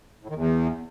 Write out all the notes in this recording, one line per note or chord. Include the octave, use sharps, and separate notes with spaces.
A2
D#3
E2